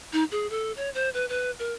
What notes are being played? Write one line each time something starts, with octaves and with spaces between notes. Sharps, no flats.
D#4
G#4
A4
C#5
C5
B4
B4
A#4